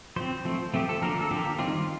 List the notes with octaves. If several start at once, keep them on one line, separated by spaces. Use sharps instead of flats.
F3 C4 C5
F3 A3 C4
F3 A3 C4 G4
A4
D3 F3 A#3 A#4
A4
D3 F3 A#3 G4
D#3 G3 C4 F4